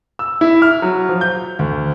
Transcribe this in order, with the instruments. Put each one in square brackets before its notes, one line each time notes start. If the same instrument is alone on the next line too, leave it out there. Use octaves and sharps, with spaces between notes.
[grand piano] E6
E4
F6
F#3
F3
G6
D2